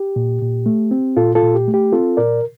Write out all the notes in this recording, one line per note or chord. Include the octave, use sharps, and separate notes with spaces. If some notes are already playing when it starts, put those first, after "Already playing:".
Already playing: G4
A#2
A#2
A3
C4
A#2 F4 A4
F4 A4
A#2
G4
A3
G4
C4 F4 A4
A#2 A#4 D5